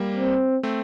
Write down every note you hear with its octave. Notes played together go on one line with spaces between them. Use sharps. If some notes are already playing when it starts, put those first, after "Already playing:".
Already playing: G3 A#3
C4
A3 C4